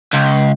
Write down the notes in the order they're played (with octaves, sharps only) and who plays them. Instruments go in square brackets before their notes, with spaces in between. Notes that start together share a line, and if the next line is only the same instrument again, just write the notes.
[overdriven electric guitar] C#2